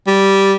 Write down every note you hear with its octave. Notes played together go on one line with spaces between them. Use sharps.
G3